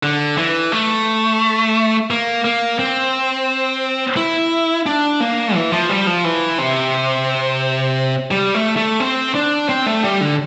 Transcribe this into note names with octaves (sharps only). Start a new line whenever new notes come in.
D3
E3
A3
A#3
A#3
C4
E4
D4
A#3
E3
F3
G3
F3
E3
C3
G3
A3
A3
C4
D4
C4
A3
G3
D3